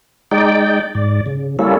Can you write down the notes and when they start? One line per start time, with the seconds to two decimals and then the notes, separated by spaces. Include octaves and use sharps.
0.31 G#3 D#4 D5 G5
0.95 G#2 D5
1.26 C#3
1.59 G3 A#3 C#4 E4 A4